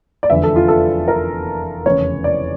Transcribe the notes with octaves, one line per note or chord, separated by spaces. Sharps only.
D5
F1 E2 D3 F3 E5
A4
F4
A4
A#4
F1 E2 C#3 C#5
D5